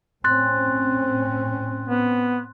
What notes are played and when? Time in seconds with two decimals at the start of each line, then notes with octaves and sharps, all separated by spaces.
0.24 A2 C4 C#4 C6 F#6 A6
1.88 B3